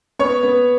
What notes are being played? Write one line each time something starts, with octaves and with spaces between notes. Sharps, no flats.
B3 C#5 C#6
B3